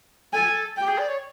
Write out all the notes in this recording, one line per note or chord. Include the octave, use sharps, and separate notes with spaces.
A4 G#5
G4 G5
G#4
D5
C#5